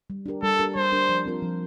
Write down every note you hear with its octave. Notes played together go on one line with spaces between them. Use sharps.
G3
D4 G4 A#4
G3 A4
D4 G4 A#4
G3 C5
D4 G4 A#4
F3
C4 F4 A#4
F3